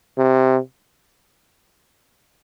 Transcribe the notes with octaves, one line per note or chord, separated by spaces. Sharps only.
C3